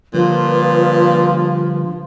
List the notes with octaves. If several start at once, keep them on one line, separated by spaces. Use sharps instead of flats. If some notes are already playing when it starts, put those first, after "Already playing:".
A#2 D3 F3 G3 B4